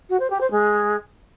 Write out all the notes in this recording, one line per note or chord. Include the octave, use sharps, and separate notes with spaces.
F#4
C5
G4
C5
G#3